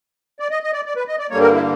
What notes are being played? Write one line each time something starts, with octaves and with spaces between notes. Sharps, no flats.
D5
D#5
D#5
D5
D5
B4
D#5
D5
G2 D3 G3 A#3 C#5
A#4
E4